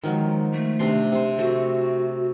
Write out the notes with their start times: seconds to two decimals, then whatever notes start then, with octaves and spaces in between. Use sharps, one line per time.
0.03 D#3 F3 F#3 G#3
0.52 A3
0.79 C3 D4 C6
1.12 C3 C5
1.39 A3 F#4